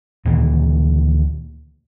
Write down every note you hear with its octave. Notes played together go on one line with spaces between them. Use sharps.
D2 A#2 D#3 E3